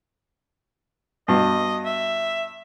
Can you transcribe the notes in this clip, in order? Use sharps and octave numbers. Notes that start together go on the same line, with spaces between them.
G2 B2 D#5
E5